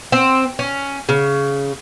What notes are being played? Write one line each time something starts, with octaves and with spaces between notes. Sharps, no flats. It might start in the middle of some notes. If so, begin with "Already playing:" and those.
C4
C#4
C#3